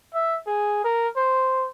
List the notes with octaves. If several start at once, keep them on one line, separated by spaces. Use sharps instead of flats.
E5
G#4
A#4
C5